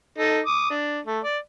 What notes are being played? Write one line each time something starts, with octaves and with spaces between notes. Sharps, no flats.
D#4 A4
D6 D#6
D4
A3
D5